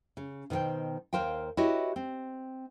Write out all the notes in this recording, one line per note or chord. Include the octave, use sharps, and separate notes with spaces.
C#3
B2 D#3 B4 C5 G5
D#2 A#4 C5 F5 G5
E4 F#4 G4 B4 C#5 D#5
C4